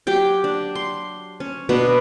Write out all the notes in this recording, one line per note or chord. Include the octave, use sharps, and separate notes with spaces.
F#3 G4 G5
D4
C6
C#4
B2 B3 D4 A#5